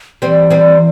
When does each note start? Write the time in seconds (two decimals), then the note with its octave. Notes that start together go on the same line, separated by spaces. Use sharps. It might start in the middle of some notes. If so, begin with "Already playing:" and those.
0.22 E3 G3 C4
0.51 G3 C4